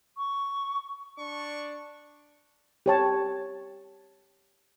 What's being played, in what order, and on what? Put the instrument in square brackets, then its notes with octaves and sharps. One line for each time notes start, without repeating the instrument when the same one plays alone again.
[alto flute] C#6
[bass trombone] D4 [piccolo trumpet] C#6
[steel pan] G4 C#5 A5